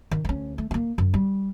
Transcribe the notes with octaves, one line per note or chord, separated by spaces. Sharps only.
D#3
D2 C#4
A3
A#3 B3
F#2
G3